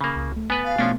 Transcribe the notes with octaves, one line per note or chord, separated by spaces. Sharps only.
C#3 A#3 B5 D#6
C#2
A3
B3 B4 G#5 F#6 A6
F5
B2 F3 A3 B3 C#4 D4